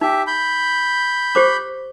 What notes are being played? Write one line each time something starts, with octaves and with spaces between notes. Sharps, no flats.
D#4 G4 E5
B5 G6
G4 C5 D6